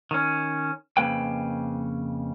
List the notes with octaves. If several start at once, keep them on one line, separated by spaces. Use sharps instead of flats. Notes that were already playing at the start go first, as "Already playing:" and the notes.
D#3 C#4
F2 C#3 A#3 B4 G5